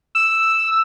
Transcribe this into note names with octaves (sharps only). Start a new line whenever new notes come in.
E6